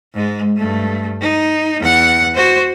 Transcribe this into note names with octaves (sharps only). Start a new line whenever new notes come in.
G#2 G#3
G2 A3
D#4
E2 F#5
F#4 C5